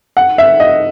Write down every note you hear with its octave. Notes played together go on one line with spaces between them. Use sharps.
F#5
E5
D#5